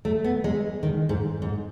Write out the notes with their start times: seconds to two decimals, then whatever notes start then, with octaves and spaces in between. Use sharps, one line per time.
0.05 A3
0.24 B3
0.44 G#3
0.83 D#3
1.09 G#2
1.42 G#2